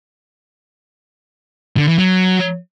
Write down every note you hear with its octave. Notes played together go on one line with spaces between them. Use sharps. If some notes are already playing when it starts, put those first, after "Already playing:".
D3
E3
F#3